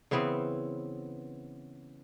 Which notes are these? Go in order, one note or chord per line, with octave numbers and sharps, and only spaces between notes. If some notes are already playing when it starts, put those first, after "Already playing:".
C#3 E3 B3 C4